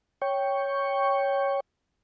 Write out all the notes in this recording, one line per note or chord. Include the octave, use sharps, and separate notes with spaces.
C#5 G5 C#6